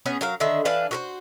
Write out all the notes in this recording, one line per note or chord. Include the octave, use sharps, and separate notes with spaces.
B3 C#4 G#4
F#3 A#4 F5
D3 D#3 E5
E3 D4 B4 F5
F#4 A#4 C5